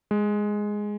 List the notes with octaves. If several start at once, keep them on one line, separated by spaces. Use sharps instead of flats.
G#3